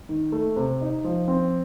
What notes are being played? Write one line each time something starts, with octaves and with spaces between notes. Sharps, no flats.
D#3
A3
C3
D#4
F3
C4